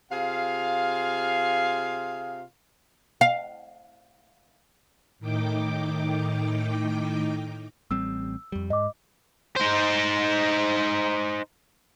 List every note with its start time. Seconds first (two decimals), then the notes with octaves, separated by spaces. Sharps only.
0.11 C3 F4 G#4 F5
3.21 F5
5.19 A2 D#3 D#4 G5 D6
7.91 A1 G3 C4 E6
8.52 F2 G3
8.70 G#2 D#5 D6
9.56 D#4 C5